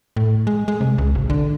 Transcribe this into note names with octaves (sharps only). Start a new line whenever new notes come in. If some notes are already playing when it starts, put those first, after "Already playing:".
A2
G#3
G#3
C3
C#2
G#1
D3